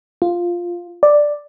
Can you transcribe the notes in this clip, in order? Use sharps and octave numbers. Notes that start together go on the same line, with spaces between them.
F4
D5